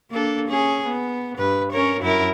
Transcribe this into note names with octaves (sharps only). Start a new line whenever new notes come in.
A#3 D4 A4
C#4 G#4
B3
G2 B4
C#4 A#4 C#5
F#2 E4 A#4